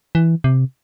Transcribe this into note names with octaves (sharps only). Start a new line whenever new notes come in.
E3
C3